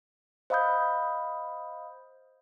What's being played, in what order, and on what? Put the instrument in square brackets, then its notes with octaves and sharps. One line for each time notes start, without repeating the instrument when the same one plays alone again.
[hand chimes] C5 D#5 F5 B5 D#6 G6